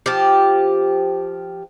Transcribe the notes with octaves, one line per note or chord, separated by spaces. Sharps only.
F3 G4